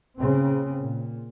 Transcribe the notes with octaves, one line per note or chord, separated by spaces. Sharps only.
A#2 C#3 C4
A#2